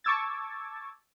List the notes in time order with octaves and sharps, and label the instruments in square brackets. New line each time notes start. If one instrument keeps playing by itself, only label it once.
[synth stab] A5 C#6 D6 E6 G#6 A6